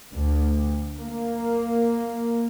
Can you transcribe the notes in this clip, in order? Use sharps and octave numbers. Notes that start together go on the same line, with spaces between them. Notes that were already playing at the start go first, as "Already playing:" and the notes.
D2
A#3